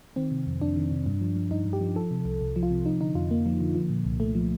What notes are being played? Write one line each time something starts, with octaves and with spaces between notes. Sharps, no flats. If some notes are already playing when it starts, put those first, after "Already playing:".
D#3 C4
C3
F2
F2 D4
D#3
C3
G2
F3
F3
G2 D#4
G2
G4
F3
F3 A4
C3
C2
C2
F3
F4
C3
F3 D#4
D3 D#4
F2 F4
F2 A#3
F3
D3
F3
A#2
C2
C2 A3
F3